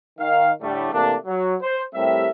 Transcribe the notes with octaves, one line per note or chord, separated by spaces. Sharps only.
D#3 F5
A2 D3 G3 A3
C3 E3 A3 A#3 D4
F#3
C5
A2 G3 C4 G4 A#4 E5